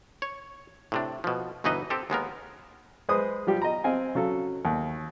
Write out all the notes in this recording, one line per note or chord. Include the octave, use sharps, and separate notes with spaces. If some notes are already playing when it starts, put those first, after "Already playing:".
C#5
A2 C3 D4
B2 F3
G1 B2 E3 D#4 B4 D#5
C4 G4 A4
D#2 G#3 B3 A#4
G#3 B4 C5 D#6
F3 G3 G4
D#5 A#5
C4 D#5 F5 G#5
C#3 F#3 A4
D#2